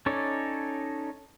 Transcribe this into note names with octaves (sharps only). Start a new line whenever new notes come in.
C#4 D#4 A4 C#5 D5